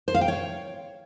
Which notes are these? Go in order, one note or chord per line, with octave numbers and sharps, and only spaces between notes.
C5
F5
G5
C#5